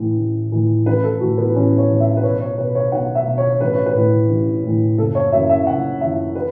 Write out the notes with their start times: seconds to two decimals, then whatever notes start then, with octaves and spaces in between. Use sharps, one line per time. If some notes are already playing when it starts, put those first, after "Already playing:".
Already playing: A1 A2 E3
0.17 A1
0.52 A2 E3
0.86 A1 B4
1.04 A4
1.20 A2 E3 F#4
1.38 B3
1.55 A1 C#4
1.78 C#5
1.89 A2 E3
2.00 E5
2.17 B4
2.23 B1 C#5
2.41 C#5
2.58 B2 B4
2.75 C#5
2.92 B1 F#5
3.15 E5
3.27 B2
3.38 C#5
3.61 A1 B4
3.73 C#5
3.86 B4
3.95 A2 E3
4.29 A1
4.64 A2 E3
4.98 F#1 A4
5.15 C#5
5.32 F#2 E5
5.37 E3
5.50 E5
5.67 F#1 F#5
6.01 F#2 E3 E5
6.35 B4